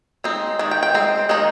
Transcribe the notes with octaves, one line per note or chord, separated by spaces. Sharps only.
G#3 C4 D#4
D#3 G#3
G5
G5
G#3 C4
D#3 G#3 D#4